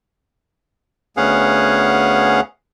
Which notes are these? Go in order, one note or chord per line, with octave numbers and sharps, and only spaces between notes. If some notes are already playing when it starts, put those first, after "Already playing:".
D2 B3 C#4 G#4 F5 F#5